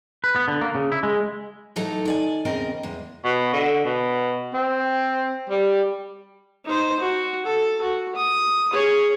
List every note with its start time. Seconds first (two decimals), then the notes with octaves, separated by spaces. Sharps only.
0.24 B4
0.36 B3
0.48 D3
0.61 A#3
0.75 C#3
0.92 E4
1.03 G#3
1.76 A2 E3 F#3 D#4 A4 A#5
2.05 D#3 D5 G#5
2.45 E2 C#3 C4 A#4 D#5
2.83 E2 G#3
3.24 B2
3.53 D3
3.85 B2
4.54 C4
5.49 G3
6.65 D#4 C5
7.00 F#4
7.46 A4
7.82 F#4
8.16 D#6
8.72 G#4 C#5